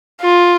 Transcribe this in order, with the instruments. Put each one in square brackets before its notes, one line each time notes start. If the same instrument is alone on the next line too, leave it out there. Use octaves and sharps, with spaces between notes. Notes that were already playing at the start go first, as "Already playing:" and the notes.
[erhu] F4